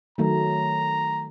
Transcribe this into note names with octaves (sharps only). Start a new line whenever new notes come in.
D#3 F#3 A3 A#5